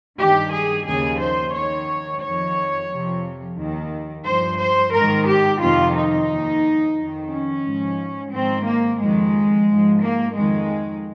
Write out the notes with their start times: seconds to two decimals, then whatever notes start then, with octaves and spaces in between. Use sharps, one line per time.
0.18 G2 D#3 G4
0.52 G#4
0.85 D#2 C#3 F3 G#4
1.19 C5
1.53 D#2 D#3 C#5
2.21 F2 D#3 C#5
2.89 F2 C3 F3
3.57 D#2 D#3
4.24 G2 F3 C5
4.58 C5
4.92 G#2 D#3 A#4
5.26 G4
5.60 F2 C3 D#3 F4
5.94 D#4
6.28 D#2 D#3
6.96 F2 D#3
7.30 C#4
7.64 G#2 F3
8.31 G#2 D#3 C4
8.65 A#3
8.99 F2 D#3 G#3
9.67 G#2 F3
10.01 A#3
10.35 F2 D#3 G#3